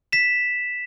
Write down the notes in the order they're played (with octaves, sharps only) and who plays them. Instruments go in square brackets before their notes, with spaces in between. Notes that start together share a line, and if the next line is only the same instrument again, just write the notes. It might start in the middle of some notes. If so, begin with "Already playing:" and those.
[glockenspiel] B6 E7